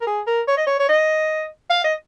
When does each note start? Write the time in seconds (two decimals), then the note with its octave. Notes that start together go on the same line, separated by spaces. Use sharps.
0.01 A#4
0.07 G#4
0.27 A#4
0.48 C#5
0.57 D#5
0.67 C#5
0.79 C#5
0.89 D#5
1.70 F5
1.84 D#5